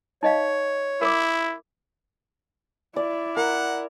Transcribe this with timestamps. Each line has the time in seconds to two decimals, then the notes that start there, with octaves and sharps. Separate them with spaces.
0.23 D#4 C#5 D#5 F5
1.02 E4 A#4 D6
2.96 E4 D5
3.36 A#4 F#5